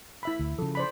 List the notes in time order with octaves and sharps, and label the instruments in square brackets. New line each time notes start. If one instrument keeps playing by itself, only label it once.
[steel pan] E4 E5 B5
[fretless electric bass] D2
[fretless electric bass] C#3 F3 [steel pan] A4
[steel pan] C5 D5 B5